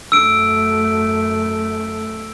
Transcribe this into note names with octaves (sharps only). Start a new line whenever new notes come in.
F#2 A3 E6 D7